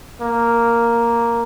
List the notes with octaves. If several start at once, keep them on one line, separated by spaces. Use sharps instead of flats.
A#3